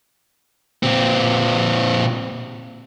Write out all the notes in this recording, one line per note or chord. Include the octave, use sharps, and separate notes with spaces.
A#2 C4